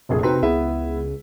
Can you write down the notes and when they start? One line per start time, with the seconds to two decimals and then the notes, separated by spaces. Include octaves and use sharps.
0.09 F1 A#1 C3 G#4
0.23 C4 D#4 F#4 B4 C5 A#5
0.43 C#2 B3 E4 G#4 E5